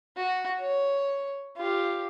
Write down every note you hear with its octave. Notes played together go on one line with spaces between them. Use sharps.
F#4
C#5
F4 G4